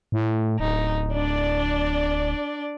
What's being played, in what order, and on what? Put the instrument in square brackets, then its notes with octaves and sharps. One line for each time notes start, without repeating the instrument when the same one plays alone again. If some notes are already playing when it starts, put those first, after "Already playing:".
[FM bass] A2
[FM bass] D1 [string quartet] D#4
[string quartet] D4 D5